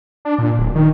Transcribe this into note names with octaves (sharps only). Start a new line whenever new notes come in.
D4
A#2
D1
D#3